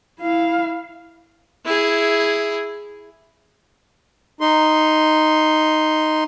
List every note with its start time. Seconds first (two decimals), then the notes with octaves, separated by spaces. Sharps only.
0.20 E4 F5
1.65 E4 G#4
4.41 D#4 C6